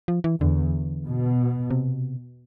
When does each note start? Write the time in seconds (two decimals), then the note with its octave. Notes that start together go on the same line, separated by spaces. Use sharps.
0.08 F3
0.24 E3
0.41 E2 D3
1.06 B2
1.71 C3